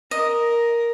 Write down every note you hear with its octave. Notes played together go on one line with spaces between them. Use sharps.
A#4 D#5